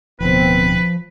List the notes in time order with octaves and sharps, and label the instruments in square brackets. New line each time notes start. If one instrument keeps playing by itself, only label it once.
[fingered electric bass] D1 B2 [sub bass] F3 [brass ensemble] B3 C4 [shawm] B4